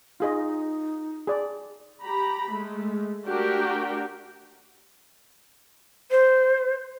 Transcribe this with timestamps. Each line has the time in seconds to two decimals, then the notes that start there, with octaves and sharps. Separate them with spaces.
0.20 D#4 F4 G#4 D#5
1.27 G#4 D5
2.04 G4 A#5 B5
2.53 G#3 A3
3.27 A3 D4 F#4 G4 A#4 G5
6.11 C5